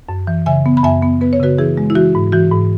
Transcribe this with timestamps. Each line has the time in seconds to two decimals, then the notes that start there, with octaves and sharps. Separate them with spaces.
0.09 F#2
0.27 E3
0.46 C#3 E5 G#5
0.66 B3
0.77 B5
0.83 F#2 E5 G#5
1.02 B3
1.21 B3 B4
1.33 C#5
1.40 C#3 F#4 B4
1.58 E3 E4 G#4
1.77 G#3
1.90 E4
1.95 E3 F#4
2.15 G#2
2.32 E3 F#4
2.52 G#2